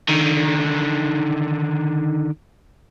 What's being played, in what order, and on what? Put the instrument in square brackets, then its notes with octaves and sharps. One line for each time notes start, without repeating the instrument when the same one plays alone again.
[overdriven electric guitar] D3 D#3